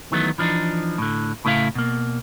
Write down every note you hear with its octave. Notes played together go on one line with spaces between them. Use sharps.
D#3 E3 F#3 A3 B3 D#4
E3 F3 D4 D#4
A2 D3
A2 C#3 A3 E4 C#5 F5
B2 A#3